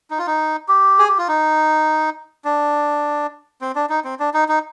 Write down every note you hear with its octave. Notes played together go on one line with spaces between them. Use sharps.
D#4
F4
D#4
G4
G#4
G4
F4
D#4
D4
C4
D4
D#4
C4
D4
D#4
D#4